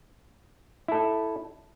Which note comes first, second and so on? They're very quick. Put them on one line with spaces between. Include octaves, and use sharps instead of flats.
E4 A4 E5